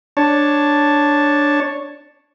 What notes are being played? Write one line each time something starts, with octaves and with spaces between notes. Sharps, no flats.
D4 C#5 A5